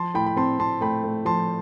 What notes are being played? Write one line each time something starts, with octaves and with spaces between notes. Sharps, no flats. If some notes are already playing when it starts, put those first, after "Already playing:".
Already playing: F3 A5 C6
A2 G5 B5
B5
C4 A5 C6
C4 A5 C6
A3 G5 B5
A3
F3 A5 C6